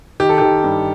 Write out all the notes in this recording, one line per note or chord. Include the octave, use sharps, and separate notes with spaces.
D#3 G4
A4
D#3 G4
G2